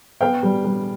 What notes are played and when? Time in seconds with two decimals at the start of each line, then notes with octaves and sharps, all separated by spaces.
0.21 B3 F5 G5
0.43 G3
0.64 G3